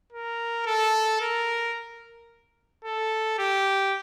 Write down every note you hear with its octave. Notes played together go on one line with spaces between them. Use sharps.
A#4
A4
A#4
A4
G4